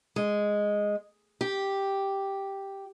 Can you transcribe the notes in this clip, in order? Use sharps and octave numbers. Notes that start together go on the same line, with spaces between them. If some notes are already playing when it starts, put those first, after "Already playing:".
G#3
G4